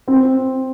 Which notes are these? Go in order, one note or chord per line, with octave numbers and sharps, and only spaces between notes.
C4